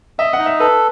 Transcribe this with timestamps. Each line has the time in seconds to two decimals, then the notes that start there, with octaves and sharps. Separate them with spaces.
0.19 D#5 E5
0.33 F#5
0.39 D#4
0.46 E5
0.60 A4 B4